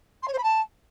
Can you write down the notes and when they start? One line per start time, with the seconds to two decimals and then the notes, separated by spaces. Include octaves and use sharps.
0.22 C6
0.27 C#5
0.32 C5
0.38 B5
0.43 A5